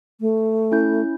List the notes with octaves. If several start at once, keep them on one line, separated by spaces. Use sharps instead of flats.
A3
C#4 E4 G6